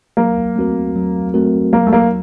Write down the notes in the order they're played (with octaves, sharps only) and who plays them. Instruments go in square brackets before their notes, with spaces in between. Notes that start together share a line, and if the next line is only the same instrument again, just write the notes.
[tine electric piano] F#3 [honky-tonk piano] A#3
[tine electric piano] A3 C4 F#4 A#4
F#3
A3 C4 F#4 A#4
[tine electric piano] F#3 [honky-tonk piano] A#3
[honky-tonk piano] A3
A#3